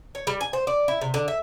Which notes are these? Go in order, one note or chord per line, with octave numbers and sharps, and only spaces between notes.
C#5
G3
G#5
C5
D5
E4
C3
D3
E5